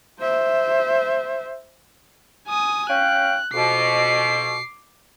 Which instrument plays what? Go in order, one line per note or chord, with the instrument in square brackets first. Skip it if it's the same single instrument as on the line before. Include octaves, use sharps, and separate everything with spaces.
[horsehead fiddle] C5 E5
[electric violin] G#5 D#6
[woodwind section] C#4 F5 G5 [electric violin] F#6
[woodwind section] F2 B2 [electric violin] D6 C7